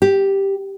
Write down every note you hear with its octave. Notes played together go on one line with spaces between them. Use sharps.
G4